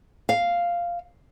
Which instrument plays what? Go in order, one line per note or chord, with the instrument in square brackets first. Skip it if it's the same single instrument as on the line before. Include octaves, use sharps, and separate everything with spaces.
[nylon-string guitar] F5